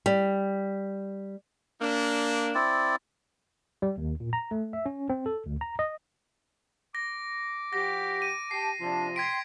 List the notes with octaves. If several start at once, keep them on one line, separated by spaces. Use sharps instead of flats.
G3
A#3 D4
C4 E4 D5
G3
D#2
A#2
A#5
A3
E5
C#4
C4
A4
D2
A#5
D#5
D6 A#6
F3 F#4 G4 A#6
D#7
G4 A5 C7
C3 F3 D4 F4 A5
G5 C6 G#6 B6 D7